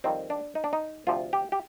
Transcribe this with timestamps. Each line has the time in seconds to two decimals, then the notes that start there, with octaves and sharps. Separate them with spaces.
0.04 F2 D#3 G3 C4
0.30 D4
0.55 D#4
0.64 D4
0.73 D#4
1.07 D2 C3 F3 F4
1.33 G4
1.52 G4